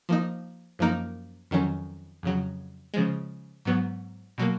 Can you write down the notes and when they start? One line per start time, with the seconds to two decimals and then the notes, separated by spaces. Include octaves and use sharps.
0.09 F3 A#3 D#4
0.79 F#2 F3 A#3 D#4 A#4
1.51 F2 D#3 F#3 C#4
2.23 F2 C#3 F#3
2.94 C#3 F3 G#3
3.65 G#2 F#3 B3
4.38 B2 F#3 A#3